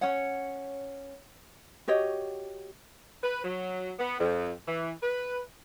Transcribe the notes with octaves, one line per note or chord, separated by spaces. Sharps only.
C#4 C#5 F#5
F#4 G4 C#5 D#5
B4
F#3
B3
F2
E3
B4